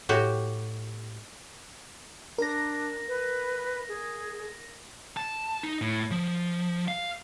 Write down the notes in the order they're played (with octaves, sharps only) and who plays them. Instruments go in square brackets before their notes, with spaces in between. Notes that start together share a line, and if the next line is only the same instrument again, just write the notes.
[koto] A2 F#4 G4
[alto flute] D4 [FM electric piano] A#4 A#6
[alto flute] B4
G#4
[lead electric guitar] A5
D#4
A2
F3
F5